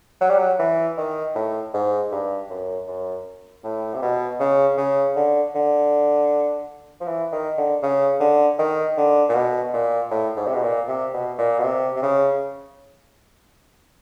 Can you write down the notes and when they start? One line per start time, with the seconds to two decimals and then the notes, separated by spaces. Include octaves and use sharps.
0.21 F#3
0.29 G3
0.38 F#3
0.59 E3
0.98 D#3
1.35 A2
1.74 G#2
2.12 G2
2.50 F#2
2.88 F#2
3.64 A2
3.94 C3
4.02 B2
4.40 C#3
4.78 C#3
5.16 D3
5.55 D3
7.01 F3
7.07 E3
7.32 D#3
7.58 D3
7.83 C#3
8.20 D3
8.59 D#3
8.97 D3
9.29 A#2
9.35 B2
9.73 A#2
10.11 A2
10.36 G#2
10.47 C3
10.54 B2
10.63 A#2
10.88 C3
11.14 B2
11.38 A#2
11.59 B2
11.63 C3
11.96 C3
12.03 C#3